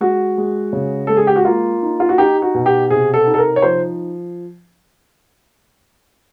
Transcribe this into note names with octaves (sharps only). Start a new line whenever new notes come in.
G#3 F#4
G#3
C#3
G#3 A4
G#4
G4
F#4
A#3 F4
D#4
F4
F#4
D#4 G4
F#4
B2
G4
C3 G#4
A4
D#4
A4
A#4
C#5
F3 C5